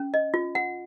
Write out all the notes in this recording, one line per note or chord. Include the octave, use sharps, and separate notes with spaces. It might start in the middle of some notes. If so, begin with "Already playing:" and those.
Already playing: C#4
D#5
F4
F#5